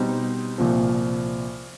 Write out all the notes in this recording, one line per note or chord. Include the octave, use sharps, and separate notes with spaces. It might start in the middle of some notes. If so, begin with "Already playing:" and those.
Already playing: B2 G3 C4 D#4
C2 A#2 F3